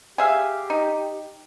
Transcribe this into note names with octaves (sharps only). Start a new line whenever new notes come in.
G4 G#4 E5 F5
D#4